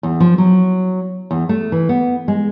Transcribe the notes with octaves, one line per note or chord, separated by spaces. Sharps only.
E2
F3
F#3
E2
A3
E3
B3
G#3